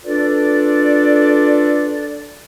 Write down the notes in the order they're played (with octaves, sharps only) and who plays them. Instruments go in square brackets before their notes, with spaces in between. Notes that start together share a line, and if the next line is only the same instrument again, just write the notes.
[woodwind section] D4 F4 A4 B4 D5